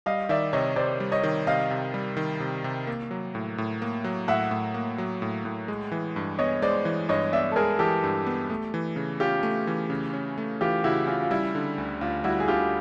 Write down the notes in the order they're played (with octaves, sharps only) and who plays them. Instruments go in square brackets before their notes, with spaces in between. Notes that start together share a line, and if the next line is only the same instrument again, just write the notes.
[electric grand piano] G3 [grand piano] D#5 F5
[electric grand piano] D#3 [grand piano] D5 E5
[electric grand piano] C3 [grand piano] C#5 D#5
[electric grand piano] C3 [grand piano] C5 D5
[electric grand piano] G3
[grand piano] C#5 D#5
[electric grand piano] D#3
[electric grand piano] C3 [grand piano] D#5 F5
[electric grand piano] C3
G3
D#3
C3
C3
A#3
F#3
A2
A2
A#3
F#3
[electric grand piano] A2 [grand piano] E5 F#5
[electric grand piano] A2
A#3
F#3
A2
A2
G#3
E3
G2
[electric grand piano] B3 [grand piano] C#5 D#5
[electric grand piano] G#3 [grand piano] C5 D5
[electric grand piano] E3
[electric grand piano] G2 [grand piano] C#5 D#5
[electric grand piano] B3 [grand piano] D5 E5
[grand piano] A4
[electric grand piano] G#3 [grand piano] G#4 A#4
[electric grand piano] E3 [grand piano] G4 A4
[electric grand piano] G2
B3
A3
E3
C#3
[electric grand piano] C#4 [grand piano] F4 G4
[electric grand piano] A3
E3
C#3
C#4
A3
[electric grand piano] E3 [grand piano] F4 G4
[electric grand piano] C#3 [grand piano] E4 F#4
[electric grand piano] C#4 [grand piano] F4
[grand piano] F4
[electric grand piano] G3 [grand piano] E4
[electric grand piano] D3
D2
[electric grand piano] D2 [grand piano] F4
[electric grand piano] G3 [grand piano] E4 F#4
[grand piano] G#4
[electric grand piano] D3 [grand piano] F4 G4